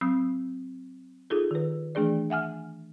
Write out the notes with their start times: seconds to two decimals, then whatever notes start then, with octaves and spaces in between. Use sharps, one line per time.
0.01 F#3 C4 D#6 E6
1.30 D#4 F4 G#4 A4
1.51 D#3 B4
1.95 E3 A3 D4 G#4 D5
2.30 E5 F#5 G#5 F6